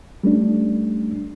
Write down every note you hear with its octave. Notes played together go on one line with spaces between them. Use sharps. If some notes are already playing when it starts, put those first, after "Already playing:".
G3 A3 C#4 D4